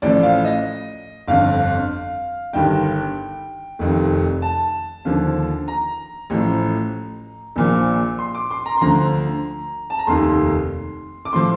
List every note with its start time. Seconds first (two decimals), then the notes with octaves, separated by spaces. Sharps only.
0.02 A1 A2 F3 D5
0.23 F5
0.45 D#5
1.28 G1 F2 D3 F5
2.53 G1 G2 D#3 G5
3.79 F1 F2 D#3
4.42 A5
5.05 D#2 D3 F3
5.68 A#5
6.30 A1 A2 F3
7.56 A#1 A#2 F3
8.19 C6
8.35 D6
8.51 C6
8.66 A#5
8.77 C6
8.81 D2 D3 F3 A#5
9.90 A5
9.99 A#5
10.07 F1 D#2 D#3 C6
11.25 D6
11.33 A2 F3 C6